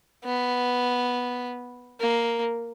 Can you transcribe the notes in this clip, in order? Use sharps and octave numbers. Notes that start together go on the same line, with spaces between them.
B3
A#3